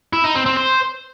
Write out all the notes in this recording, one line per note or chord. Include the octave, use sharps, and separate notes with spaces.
E4
D#4
C4
C4
C5